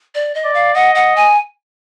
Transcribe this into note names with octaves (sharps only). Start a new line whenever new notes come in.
D5
D#5
D5
F5
D#5 F#5
F#5
G#5